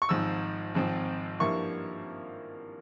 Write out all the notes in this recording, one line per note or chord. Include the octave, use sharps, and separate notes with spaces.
C#6
G#1 G#2 F3 E6
G#1 G#2 F3 C4
G2 F3 A#3 E4 C#6